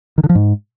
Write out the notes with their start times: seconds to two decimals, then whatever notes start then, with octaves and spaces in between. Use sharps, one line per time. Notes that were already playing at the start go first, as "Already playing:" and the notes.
0.18 D#3
0.24 D3
0.29 F3
0.35 G#2